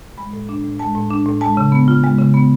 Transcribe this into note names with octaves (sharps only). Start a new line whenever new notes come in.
G#3 B5
A2
D4
A2
G#3 A5
A2
D4
A2
G#3 A5
C#3
B3
F4
G#3
C#3
B3